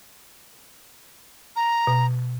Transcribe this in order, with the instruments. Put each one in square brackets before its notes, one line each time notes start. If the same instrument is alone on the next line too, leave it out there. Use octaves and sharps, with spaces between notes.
[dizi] A#5
[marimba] B2